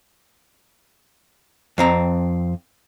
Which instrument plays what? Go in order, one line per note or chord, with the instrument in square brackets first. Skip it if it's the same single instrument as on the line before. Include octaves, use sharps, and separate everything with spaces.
[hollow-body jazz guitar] F2 C4 A#5